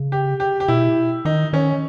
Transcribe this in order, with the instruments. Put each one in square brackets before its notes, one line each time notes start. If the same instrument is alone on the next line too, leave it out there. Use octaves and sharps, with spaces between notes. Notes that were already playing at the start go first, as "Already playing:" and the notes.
Already playing: [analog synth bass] C#3
[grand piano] G4
G4
G4
[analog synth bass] B2 [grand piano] E4
[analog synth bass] D#3 [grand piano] D#4
[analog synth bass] D#3 [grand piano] C#4